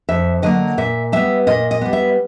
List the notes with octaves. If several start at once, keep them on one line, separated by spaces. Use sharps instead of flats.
F2 E5
D3 F#3 A#3 D#5
A#2 E5
G3 B3 E5
A#2 D#5
D#5
G3 B3
E5